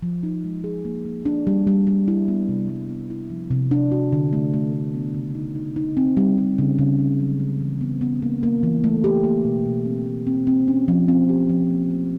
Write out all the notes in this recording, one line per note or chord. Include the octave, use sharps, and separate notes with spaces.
F3
D#4
G#3
G#4
A#3
A#3
D4
G3
G3
G3
E4
B3
C3
G3
B3
E4
F3
C3
D4
F#4
D3
A3
A3
A3
B3
C#3
D#4
D#4
D#4
C4
G3
G3
C#3
C#3
A3
F#3
G#3
E3
B3
B3
A#3
A#3
E3
A3
G4
A#3
B2
B2
C4
A3
C4
C4
C#4
F3
C4
G4
F3
A#3
A3